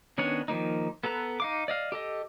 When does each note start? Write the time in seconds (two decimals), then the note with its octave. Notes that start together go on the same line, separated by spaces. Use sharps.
0.18 D#3 B3 C#4 D4 C#5
0.48 D#3 F3 A#3 D#4
1.04 B3 A4 B4 A#5
1.40 D#4 F5 D6
1.68 D5 D#5 F5
1.92 G4 A4 D#5